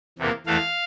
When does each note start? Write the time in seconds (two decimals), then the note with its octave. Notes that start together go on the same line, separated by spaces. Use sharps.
0.18 E2 C3 E3 A#3
0.46 E2 E3 A3 F5